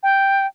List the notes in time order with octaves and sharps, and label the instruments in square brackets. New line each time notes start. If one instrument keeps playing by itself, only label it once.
[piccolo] G5